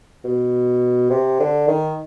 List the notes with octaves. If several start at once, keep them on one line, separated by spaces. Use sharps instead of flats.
B2
C3
D3
D#3